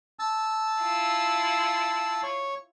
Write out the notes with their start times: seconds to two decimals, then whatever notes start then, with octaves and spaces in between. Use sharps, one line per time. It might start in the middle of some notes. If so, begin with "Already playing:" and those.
0.19 A5 E6
0.82 E4 F4
2.23 C#5